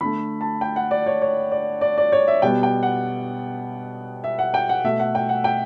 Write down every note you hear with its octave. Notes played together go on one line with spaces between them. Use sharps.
D3 A3 B5
A5
G5
F#5
D5
C#5
C#5
D5
D5
D5
C#5
E5
B2 G3 B3 G5
G5
F#5
E5
F#5
G5
F#5
B2 A3 E5
F#5
G5
F#5
G5